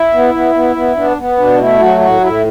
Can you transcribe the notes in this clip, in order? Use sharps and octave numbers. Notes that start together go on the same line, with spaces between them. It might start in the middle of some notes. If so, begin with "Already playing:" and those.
Already playing: E4
B3
B3
B3
B3
B3 D4
B3
B2 D4
A3 E4
F#3 F#4
A2 F#4
A2 E4